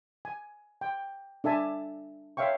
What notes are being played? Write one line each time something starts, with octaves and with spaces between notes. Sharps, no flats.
G#5
G5
D4 A4 E5 G#5 A5
C#5 E5 F5 G5 C#6